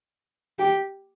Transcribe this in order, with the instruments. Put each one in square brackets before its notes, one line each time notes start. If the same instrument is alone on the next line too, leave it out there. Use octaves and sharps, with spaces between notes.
[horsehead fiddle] G4